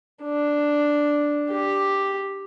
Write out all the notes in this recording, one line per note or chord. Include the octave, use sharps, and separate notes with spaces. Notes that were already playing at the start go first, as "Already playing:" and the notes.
D4
G4